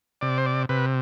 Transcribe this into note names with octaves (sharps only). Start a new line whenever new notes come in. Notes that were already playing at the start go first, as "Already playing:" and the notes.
C3 D5
C5
D5
C3 B4